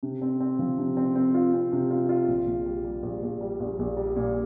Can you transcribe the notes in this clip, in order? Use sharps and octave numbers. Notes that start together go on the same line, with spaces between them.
C3
C4
C4
F3
C3
C4
C4
F4
C4
C3
F4
F4
A#1
A#1
G3
G3
A#1
A#1
G3
A#1
A#1
G3
A#2